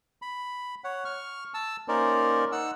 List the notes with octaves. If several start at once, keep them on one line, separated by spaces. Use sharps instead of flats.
B5
C#5 F#5
C#6 F6
A5 E6
A#3 C#4 D#4 A#4 C5 D5
D#4 F#5 E6